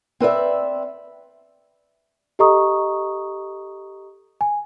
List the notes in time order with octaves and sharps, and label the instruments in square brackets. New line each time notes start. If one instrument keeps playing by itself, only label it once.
[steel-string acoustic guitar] C4 B4 D5 E5
[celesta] G4 A4 D#5 A#5 C#6 D#6
G#5